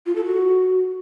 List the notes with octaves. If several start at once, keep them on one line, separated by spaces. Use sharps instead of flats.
F4
A4
F#4